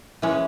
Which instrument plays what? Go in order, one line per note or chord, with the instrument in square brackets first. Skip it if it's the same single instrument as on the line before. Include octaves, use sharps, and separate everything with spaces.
[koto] E3 G#3 C#4